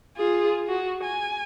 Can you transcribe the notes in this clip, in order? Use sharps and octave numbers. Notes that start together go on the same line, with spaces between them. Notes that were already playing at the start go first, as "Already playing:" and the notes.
F4 G#4
F#4
G#5